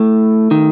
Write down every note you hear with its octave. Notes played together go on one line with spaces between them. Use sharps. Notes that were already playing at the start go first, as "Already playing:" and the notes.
Already playing: A2 A3
D#3